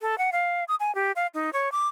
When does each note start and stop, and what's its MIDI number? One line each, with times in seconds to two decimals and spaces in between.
0.01 0.18 69
0.18 0.30 78
0.32 0.64 77
0.68 0.75 87
0.80 0.94 80
0.95 1.12 67
1.16 1.27 77
1.34 1.50 63
1.53 1.72 73
1.72 1.88 86